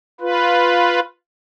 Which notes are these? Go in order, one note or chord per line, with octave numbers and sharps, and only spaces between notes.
F4 B4